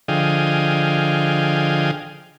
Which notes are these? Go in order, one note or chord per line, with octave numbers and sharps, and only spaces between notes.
D3 F3 G#4 D#5 F5 G5